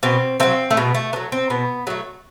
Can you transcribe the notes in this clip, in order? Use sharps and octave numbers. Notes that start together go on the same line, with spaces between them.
B2 C4
F#3 A3 C4
A3
B2 B3
A3
F#3 A3 B3
C4
B2 B3
F#3 A3 B3